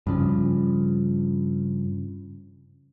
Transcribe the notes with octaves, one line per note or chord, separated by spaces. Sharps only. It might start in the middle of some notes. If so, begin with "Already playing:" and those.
G2 C#3 F3